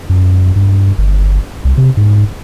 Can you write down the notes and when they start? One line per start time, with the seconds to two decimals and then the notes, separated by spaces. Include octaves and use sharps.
0.09 F#2
0.56 G2
0.98 G1
1.65 C2
1.77 C3
1.97 G#2